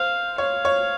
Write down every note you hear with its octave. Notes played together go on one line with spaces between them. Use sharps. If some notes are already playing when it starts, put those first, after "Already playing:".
Already playing: C5 F5
C#5 F5
C#5